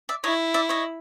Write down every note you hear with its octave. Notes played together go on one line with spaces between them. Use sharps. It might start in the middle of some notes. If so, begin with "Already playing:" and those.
D5 E5
E4 C#5 D#5
D5 E5
C#5 D#5